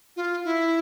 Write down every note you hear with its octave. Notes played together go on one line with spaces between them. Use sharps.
F4
E4